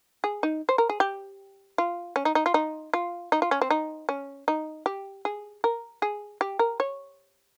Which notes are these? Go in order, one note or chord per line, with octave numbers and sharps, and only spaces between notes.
G#4
D#4
C5
A#4
G#4
G4
F4
C#4
D#4
D#4
F4
D#4
F4
D#4
F4
C#4
C4
D#4
C#4
D#4
G4
G#4
A#4
G#4
G4
A#4
C#5